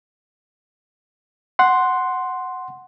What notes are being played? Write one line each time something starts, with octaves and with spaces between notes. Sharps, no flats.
F#5 C6